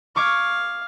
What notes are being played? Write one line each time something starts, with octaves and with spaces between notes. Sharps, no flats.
F5 C#6 D6 G#6